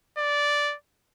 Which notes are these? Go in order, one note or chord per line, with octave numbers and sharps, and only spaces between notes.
D5